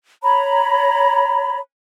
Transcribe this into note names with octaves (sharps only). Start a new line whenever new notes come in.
C#5 A#5 B5